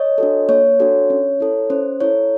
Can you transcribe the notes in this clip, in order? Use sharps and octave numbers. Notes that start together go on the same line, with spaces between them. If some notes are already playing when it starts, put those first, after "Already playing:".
Already playing: C#5 D#5
D4 F#4 A4
A#3 C#5
D4 F#4 A4
C#4
E4 A4
C#4 C5
E4 A4 C#5